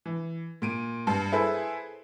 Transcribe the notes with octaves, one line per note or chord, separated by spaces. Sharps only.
E3
A#2 D7 D#7
G2 C7
E4 G#4 A4 B4 C5